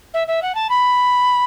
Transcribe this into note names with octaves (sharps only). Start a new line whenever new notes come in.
E5
E5
F#5
A5
B5